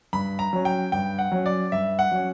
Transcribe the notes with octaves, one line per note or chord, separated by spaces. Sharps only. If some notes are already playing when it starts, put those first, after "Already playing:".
G2 B5
A#5
F#3 C#4
G5
G2 G5
F#5
F#3 C#4
D5
G2 E5
F#5
F#3 C#4